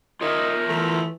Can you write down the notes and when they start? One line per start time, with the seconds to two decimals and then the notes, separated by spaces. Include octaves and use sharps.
0.21 D#4 F4 A#4 C#5 E5
0.69 E3 A3